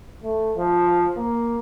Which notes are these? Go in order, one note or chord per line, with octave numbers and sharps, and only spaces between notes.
A3
F3
A#3